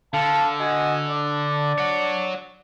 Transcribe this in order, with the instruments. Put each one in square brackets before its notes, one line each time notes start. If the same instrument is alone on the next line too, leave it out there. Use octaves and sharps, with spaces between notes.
[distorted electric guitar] D3 [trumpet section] F5 A5
[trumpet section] F#4 D#5 G#5
D4 D5
[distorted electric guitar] C#5 F#5